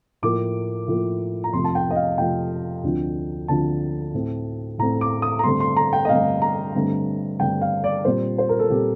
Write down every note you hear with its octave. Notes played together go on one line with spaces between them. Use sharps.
A2 F3 A#3 D6
A2 F3 A#3
A#5
F2 C3 F3 A3 C6
A5
G5
D#5
F5
F2 C3 F3 A3 G5
D2 D3 F3 C4
D2 D3 F3 C4 A5
A2 A3 C4
A2 A3 C4 A#5
D6
D#6
A#5
G2 D3 A3 C4 C6
C6
A#5
G5
D#5
G2 D3 A3 C4 F5
A#5
G2 D3 A3 C4
G2 D3 A3 C4 G5
F5
D5
A#2 G3 C4 C5
C5
A#4
A4
A#2 G3 C4 G4